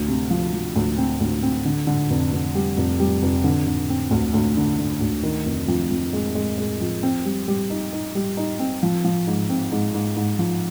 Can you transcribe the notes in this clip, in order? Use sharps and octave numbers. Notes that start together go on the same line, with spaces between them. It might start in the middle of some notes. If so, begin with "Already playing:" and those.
Already playing: D2
C3
F3
F3
D2
C4
D2
C4
D3
D3
F1
F1
G3
F1
G3
F1
D3
D3
C4
D2
D2
D3
D3
D2
D#3
F1
F2
F2
G#3
G#3
G#3
F2
C4
G3
G3
D#4
D#4
G3
D#4
C4
F3
F3
G#2
C4
G#2
G#2
G#2
F3